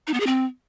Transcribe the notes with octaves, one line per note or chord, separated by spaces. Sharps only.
D#4
B3
G#4
C4